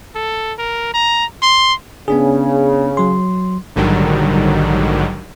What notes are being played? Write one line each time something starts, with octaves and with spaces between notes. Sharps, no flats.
A4
A#4
A#5
C6
C#3 B3 D4 G#4
F#3 C6
A#1 G#2 D3 D#3 F#3 G3